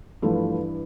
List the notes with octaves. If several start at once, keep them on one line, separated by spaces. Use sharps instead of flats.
G2 E3 F3 A3